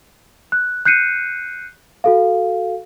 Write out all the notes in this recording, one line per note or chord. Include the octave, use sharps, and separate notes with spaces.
F#6
F#6 G6 C7 C#7 D#7
F#4 A4 F5